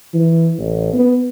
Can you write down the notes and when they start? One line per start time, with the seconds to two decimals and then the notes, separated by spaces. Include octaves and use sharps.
0.14 E3
0.58 A1
0.94 B3